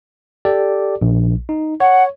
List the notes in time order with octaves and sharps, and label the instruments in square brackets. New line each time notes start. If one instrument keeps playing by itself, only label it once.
[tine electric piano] G4 A4 D5
A#1
D#4
[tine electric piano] C#5 [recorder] F#5